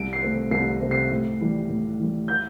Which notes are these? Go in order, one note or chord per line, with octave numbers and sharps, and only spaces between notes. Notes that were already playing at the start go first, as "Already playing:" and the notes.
Already playing: C2 D7
C7
C3 A3 C4
C2 C7
C3 A3 C4
C7
A2
E3 G3
A2
E3 G3
G6